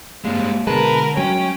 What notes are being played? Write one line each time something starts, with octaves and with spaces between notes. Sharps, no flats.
G2 G#3 A#3 G4 G#4
B2 D3 G#3 A#4 B4 A5
F#3 G#3 C#4 G5